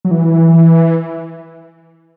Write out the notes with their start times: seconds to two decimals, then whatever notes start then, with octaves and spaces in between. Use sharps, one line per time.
0.05 F#3
0.11 E3